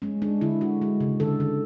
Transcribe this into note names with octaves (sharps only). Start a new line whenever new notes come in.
G#3 C#4
G#3 D4
D3 E4
G#3 F#4
G#3
C#3
D3 A4
D3